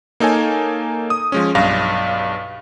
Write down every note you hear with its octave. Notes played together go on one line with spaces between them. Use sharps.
A#3 D#4 A4 C#5 G#5
D#6
F3 G#3 C#4
B1 G2 F5 A#6